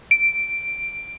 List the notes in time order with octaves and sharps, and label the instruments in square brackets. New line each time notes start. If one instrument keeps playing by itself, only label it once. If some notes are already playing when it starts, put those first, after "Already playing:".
[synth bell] D7